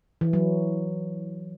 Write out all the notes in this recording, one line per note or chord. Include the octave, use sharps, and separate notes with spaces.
E3
F#3